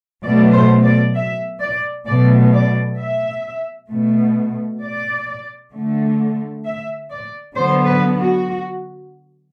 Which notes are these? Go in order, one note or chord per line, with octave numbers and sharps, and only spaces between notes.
B2 F#3 A3 D5
C5
D5
E5
D5
B2 F#3 A3 D5
D5
E5
B2 A3
D5
D3 A3
E5
D5
D3 F#3 B3 C5
B4
F#4